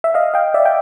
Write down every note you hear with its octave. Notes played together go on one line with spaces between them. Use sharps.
E5
D#5 F5
F5 G5
D5 E5
G5